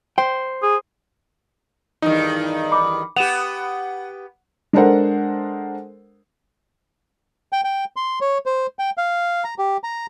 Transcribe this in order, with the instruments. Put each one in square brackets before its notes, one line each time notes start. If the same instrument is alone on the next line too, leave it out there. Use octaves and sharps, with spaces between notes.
[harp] C5 [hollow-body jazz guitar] G5
[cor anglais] G#4
[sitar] E2 G2 D#3 [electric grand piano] D#4
[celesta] B5 D6
[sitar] B3 G4 [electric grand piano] F#5 [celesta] E7 F7
[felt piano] G#3 D4 A4 A#4 C5 F#5
[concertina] G5
G5
C6
C#5
C5
G5
F5
A#5
G4
A#5